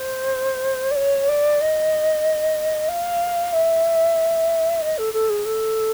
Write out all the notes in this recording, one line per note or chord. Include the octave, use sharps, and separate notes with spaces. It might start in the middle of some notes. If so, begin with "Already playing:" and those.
Already playing: C5
D5
C#5
D5
D#5
F5
E5
D#5
A4
A4
G#4
A4